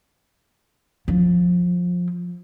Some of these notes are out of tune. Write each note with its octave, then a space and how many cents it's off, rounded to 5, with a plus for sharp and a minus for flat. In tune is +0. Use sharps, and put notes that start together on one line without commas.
F3 +20